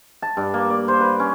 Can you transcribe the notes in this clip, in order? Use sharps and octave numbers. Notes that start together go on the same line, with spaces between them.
A5
G2
A#3
D5
C5
B4
C#4